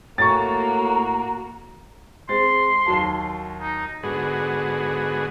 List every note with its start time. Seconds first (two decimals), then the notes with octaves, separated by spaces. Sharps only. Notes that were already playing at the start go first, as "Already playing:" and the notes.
0.18 A2 A#3 F#4 A#5 C#6 A6
2.29 G#3 C4 C6 A6
2.86 D#2 F#3 A5
3.59 D#4
4.03 G#2 D3 B3 F#4 G#4